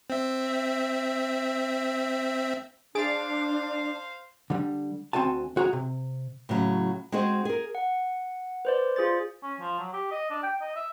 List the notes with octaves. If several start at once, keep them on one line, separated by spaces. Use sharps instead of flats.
C4 E5
D4 G#4 C5 F5 A6 D7
D3 G3
D2 C4 F#4 G#5 A5
D2 F#4 G#4 A#5
C3
A2 C#3 F#3
G#3 C4 D#4 F#4 G#4 C5
G#4 A#4
F#5
B4 C5 D5
F4 G#4 C5 A6
C#4
F3
F#3
G4
D#5
D4
G5
D#5
E5